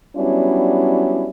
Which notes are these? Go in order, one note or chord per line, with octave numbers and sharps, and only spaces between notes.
F#3 G3 B3 C#4 D4 E4